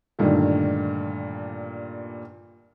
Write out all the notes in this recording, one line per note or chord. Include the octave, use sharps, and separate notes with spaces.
G2 A#2 D3 D#3 A3